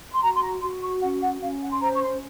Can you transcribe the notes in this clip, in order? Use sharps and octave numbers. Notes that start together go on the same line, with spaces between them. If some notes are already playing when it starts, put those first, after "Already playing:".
C6
F#4 A#5
C6
A#5
F#4 C6
C#6
C#4 F#5
F#5
C#4 F5
F#5
C6
C5 A#5
C#6
C6